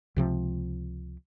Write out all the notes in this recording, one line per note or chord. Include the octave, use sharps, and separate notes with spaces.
C#2 C3 F3